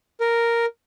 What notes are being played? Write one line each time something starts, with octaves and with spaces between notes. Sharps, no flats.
A#4